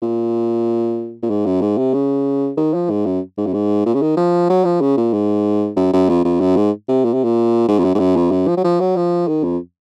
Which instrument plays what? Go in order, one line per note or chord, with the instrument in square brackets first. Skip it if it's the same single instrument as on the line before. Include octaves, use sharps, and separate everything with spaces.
[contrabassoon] A#2
A#2
G#2
F#2
G#2
C3
C#3
D#3
F3
G#2
F#2
G#2
F#2
G#2
A#2
C#3
D#3
F3
F#3
F3
C#3
A#2
G#2
F#2
F#2
F2
F2
F#2
G#2
C3
A#2
C3
A#2
G#2
F2
F#2
G#2
F#2
F2
F#2
F3
F#3
F3
F#3
F3
D#3
F2